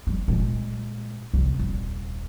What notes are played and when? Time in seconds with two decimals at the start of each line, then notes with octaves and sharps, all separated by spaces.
0.07 G3
0.28 A#2 G#3
1.34 C2
1.59 D#1